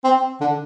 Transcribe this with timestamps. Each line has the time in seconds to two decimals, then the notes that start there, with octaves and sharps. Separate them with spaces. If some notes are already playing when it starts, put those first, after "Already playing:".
0.04 C4
0.41 D3